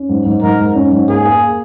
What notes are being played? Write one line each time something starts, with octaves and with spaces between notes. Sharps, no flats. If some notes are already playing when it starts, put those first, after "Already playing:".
Already playing: C#4
G#2
G#2
G#2 A#4
G#2
C#4
G#2
A#3 G#4
A#3